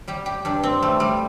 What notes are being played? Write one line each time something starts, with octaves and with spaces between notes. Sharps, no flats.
G3 G4
G4
G2 D4
C4
G3 A3
G3